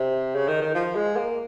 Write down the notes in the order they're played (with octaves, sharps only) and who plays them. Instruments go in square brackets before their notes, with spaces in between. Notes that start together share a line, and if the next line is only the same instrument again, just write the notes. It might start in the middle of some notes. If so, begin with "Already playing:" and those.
Already playing: [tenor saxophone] C3
C#3
D#3
D#3
F3
G#3
A#3